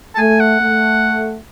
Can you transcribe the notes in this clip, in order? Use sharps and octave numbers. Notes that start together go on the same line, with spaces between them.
A5
A3 G#5
F#5
A3